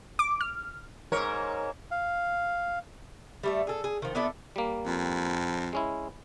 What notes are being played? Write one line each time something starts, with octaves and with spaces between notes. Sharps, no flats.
D6
F6
G#2 A#4 C#5
F5
G3 A3 E5
G#4 A4
G#4
D#3 F3
B3 D4 E4 A4
G3 A#3
F2
G#3 C#4 E4